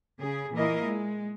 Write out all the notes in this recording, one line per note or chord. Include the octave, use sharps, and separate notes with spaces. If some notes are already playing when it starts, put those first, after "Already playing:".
C#3 G#4
A#2 E3 E4 A#4 D#5 F5
G#3